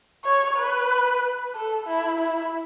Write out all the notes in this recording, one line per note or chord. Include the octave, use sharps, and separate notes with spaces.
C#5
B4
A4
E4
E4